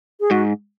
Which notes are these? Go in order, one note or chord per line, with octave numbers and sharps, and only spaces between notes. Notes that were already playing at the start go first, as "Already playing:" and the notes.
G#4
G#2 F#4